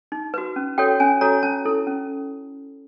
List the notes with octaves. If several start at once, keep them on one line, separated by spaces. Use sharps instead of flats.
D#4
F#4 B4
C#4
F#4 A4 C#5 G5
C#4 G#5
F#4 A4 C#5 A#5
C#4 A5
E4 A4
C#4